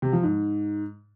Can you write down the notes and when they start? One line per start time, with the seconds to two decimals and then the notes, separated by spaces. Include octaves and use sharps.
0.02 C3
0.13 F3
0.23 G#2